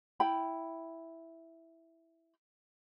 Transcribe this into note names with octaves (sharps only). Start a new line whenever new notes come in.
E4 G5 B5